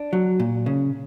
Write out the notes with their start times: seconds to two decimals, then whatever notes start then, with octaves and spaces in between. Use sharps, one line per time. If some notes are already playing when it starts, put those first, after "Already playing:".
Already playing: D4
0.13 F#3
0.40 A#2
0.66 C#3